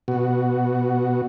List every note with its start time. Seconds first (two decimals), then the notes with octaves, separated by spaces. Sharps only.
0.08 B2 F#4